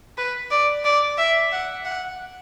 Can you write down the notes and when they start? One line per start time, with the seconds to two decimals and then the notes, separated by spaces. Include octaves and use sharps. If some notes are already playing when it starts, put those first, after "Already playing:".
0.18 B4
0.51 D5
0.85 D5
1.18 E5
1.52 F#5
1.85 F#5